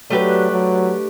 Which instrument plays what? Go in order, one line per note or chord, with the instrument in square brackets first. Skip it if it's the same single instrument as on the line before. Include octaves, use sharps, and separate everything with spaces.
[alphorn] F#3 [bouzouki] A3 D4 G4 B4
[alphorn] F#3